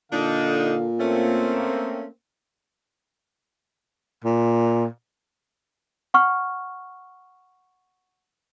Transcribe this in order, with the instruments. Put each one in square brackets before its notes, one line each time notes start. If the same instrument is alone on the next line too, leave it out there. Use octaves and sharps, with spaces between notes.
[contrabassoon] A#2 [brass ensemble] D3 A4 F5 [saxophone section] D4 D#4
[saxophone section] A3 C#4 [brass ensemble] A#3 C4
[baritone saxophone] A#2
[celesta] F#5 C#6 F6